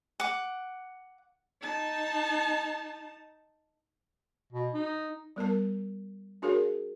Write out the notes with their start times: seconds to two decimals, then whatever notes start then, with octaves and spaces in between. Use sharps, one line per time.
0.20 F#5 D6
1.61 D#4 A5
4.53 B2
4.74 D#4
5.36 G3 B3 A#4 A5
6.42 D4 F#4 G#4 A#4 C#5 F5